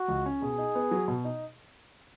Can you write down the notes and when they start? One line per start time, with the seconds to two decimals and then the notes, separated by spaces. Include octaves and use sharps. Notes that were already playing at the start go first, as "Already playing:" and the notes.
Already playing: F#4
0.08 C#2
0.26 C#4
0.42 B2 G#4
0.58 D#4
0.75 B3
0.91 F#3
1.08 B2
1.25 D#4